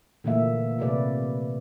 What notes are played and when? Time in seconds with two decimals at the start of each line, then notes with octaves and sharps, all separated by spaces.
0.24 A#2 D3 E3 A3 A#3 E5
0.79 C3 A3 B4 D5